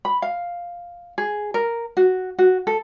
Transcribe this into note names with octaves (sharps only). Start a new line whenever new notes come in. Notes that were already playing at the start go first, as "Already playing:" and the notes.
B5
F5
G#4
A#4
F#4
F#4
A4